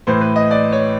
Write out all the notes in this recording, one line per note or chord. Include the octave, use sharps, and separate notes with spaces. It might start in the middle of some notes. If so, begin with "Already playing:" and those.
A2 E3 C5
B4
D#5
D5
C#5